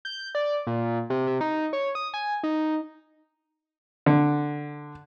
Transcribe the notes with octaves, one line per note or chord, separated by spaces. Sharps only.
G6
D5
A#2
C3
C3
D#4
C#5
D#6
G#5
D#4
D3